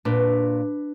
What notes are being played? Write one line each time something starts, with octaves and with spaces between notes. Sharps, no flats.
A#2 D4 B4